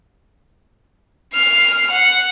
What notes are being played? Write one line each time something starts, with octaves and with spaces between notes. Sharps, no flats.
F6 C7
F#5